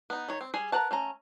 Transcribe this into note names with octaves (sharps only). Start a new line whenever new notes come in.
B3 D#4
D#3 C#5
C4
G3 G#4 G#5
A#4 B4 F#5 A5
A3 C#4 A#5